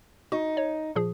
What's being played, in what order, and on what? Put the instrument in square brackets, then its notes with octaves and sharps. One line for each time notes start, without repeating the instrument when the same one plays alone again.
[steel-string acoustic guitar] D#4 [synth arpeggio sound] F#4
[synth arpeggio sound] C#5
A#2 F3 G#4